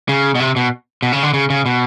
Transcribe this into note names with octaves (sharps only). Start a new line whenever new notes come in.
C#3
B2
C3
B2
B2
C#3
D3
C#3
C#3
B2